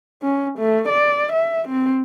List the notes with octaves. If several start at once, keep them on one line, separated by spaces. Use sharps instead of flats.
C#4
A3
D5
E5
C4